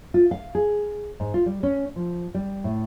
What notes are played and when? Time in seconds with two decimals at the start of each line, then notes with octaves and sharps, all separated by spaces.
0.14 F4
0.31 F5
0.55 G#4
1.20 G#2
1.34 F4
1.46 G3
1.63 C#4
1.96 F3
2.34 G3
2.64 A2